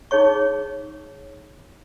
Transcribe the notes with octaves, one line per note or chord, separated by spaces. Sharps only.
D#4 G#4 C#5 C#6